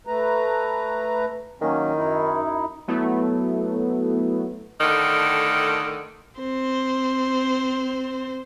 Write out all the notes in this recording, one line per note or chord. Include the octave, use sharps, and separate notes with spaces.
A3 B4 A#5
D#3 F#3 A#3 C#4
F#2 D#4 E4
F#3 A3 B3 E4
A2 D3 D#3 A3
C4 C5